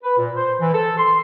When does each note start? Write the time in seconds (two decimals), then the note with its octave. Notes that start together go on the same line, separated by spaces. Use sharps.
0.02 B4
0.17 A#2
0.36 C5
0.61 E3
0.74 A4
0.98 C6